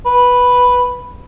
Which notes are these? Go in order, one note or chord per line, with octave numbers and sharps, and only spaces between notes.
B4